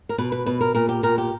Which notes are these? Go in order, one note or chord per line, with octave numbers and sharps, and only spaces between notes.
A#4
B2 B4
B4
B2 B4
A#4
A#2 A#4
G4
A#2 A#4
G4